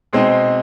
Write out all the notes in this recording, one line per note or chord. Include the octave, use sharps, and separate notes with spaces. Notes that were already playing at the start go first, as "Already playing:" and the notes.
B2 G#3 C4 D#4